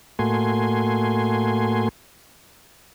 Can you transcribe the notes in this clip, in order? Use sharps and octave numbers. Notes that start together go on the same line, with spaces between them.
A2 A3 A#3 F#4 G#5 C6